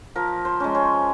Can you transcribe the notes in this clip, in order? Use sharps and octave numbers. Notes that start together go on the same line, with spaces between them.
F3 A#4
C5
G#3 C#4
C#5